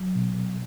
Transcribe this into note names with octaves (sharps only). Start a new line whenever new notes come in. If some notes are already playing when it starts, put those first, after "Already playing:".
Already playing: F#3
B2